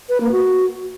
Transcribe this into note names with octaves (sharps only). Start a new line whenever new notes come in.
B4
A#3
F#4